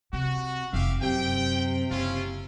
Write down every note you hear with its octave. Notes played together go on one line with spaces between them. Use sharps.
C3 F#4
F1 E3 G4 E5 F5
F#2 C3 G5
F#1 C#4 E4 F4